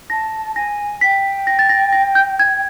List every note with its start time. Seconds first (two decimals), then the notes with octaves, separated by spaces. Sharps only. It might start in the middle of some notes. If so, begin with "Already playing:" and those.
0.10 A5 A#6
0.55 G#5 A#6
1.01 G5 B6
1.47 A#6
1.59 A6
1.69 A#6
1.93 A#6
2.15 G6
2.39 G#6